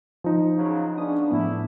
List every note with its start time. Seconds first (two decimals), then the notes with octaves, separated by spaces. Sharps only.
0.24 F3 D#4
0.55 C#3 F#3
0.97 C#3 B3 C#4 D4 D#6
1.30 A2 F3 B3 E4